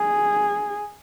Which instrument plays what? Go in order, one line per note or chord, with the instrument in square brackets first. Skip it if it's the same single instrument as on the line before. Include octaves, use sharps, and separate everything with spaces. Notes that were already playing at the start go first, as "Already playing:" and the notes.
Already playing: [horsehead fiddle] G#4